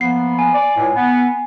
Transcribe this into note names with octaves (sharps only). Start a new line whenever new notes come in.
F3 A#3 B3 C7
G#5
D5
C#2 A2
B3